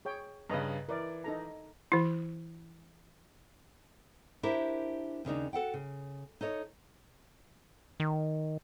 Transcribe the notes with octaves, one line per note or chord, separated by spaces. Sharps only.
G#4 C#5 G5
G2 C#3 B4 D#5 A#5
E3 A#4 D5
D#4 A4 A#5
E3 E4
D4 E4 G4 A#4 C5 E5
D#2 C#3 D4 D#4
F#4 A4 F#5 G5
C#3
D#4 A4 C#5 D#5
D#3